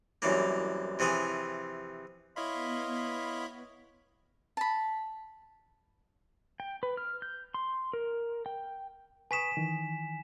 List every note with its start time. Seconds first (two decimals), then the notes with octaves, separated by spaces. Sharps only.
0.22 C2 F#2 E3 A#3
0.99 C3 E3 F3 G#4 G#5
2.36 B3 E4 C#5 D#5 F5 B5 C6
4.57 A5 B5
6.60 G5
6.83 B4
6.97 F6
7.22 G6
7.54 C6
7.93 A#4
8.46 G5
9.31 B4 G#5 C#6 D#6 B6 E7
9.57 D#3 E3